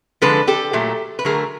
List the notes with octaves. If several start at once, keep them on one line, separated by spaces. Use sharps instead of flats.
D3 F3 G#3 A4 B4
G4 A4
A#2 F#3 A3
B4
D3 F#3 A3 G#4 A#4